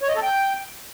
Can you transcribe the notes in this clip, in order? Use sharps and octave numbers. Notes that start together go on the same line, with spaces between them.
C#5
D#5
A4
G5